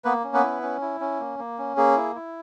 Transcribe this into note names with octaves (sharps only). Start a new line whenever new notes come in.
A#3 B3 B4
C#4
B3 B4
E4
C#4
E4
C#4
A#3
A#3
C#4
A#3 G#4
E4
E4